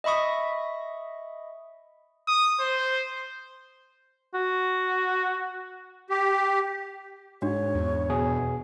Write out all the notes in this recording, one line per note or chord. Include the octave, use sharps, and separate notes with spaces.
D#5 E5 B5 C#6 D#6
D#6
C5
F#4
G4
G#2 D4 F#4 C#5
E2
B2 G#4